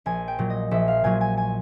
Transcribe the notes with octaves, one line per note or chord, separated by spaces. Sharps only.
A#1 G#5
G5
A#2 F#3
D#5
A#1 E5
F5
A#2 F#3 G#5
G#5
G#5